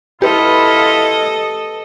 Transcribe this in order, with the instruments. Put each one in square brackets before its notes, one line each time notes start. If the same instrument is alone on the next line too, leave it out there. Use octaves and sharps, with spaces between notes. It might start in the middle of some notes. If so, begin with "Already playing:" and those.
[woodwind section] E4 F4 [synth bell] G4 B4 [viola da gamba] A4 D#5